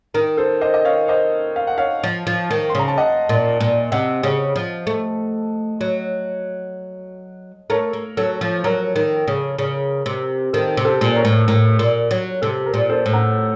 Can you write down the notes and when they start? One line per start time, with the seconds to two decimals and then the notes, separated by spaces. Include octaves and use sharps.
0.14 D#3 A#4
0.37 A4 C5
0.61 C5 D#5
0.74 D#5
0.85 C#5 F5
1.08 C5 D#5
1.56 F5
1.67 F#5
1.78 C#5 F5
2.04 F3
2.27 F3
2.51 D#3
2.70 C6
2.75 C#3 A#5
2.88 A5
2.98 D#5 F#5
3.29 A#2
3.61 A#2
3.92 C3 D#5 F#5
4.23 C#3
4.56 F3
4.87 A3
5.81 F#3
7.70 A3 A#4 C#5
7.93 A#3
8.17 F#3 A4
8.41 F3
8.64 F#3 A#4
8.96 D#3
9.28 C#3
9.59 C#3
10.06 C3
10.53 D#3 A4 C5
10.77 C3
10.85 A4 C5
11.01 A#2
11.16 A#4 C#5
11.25 A2
11.48 A2 A#4
11.79 A#2
12.11 F#3
12.42 C3 A4
12.66 A#4
12.74 A#2
12.90 A4 C5
13.06 A2
13.13 F#5 A#5